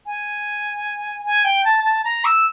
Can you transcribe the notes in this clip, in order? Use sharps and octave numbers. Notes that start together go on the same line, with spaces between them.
G#5
G#5
G5
A5
A5
A#5
E6